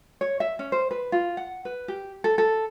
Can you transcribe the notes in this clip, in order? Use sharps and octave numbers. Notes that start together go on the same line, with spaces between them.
C#5
E5
C#4
C5
B4
F4
F#5
B4
G4
A4
A4